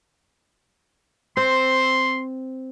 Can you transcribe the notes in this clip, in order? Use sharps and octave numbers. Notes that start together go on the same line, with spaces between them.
C4 C6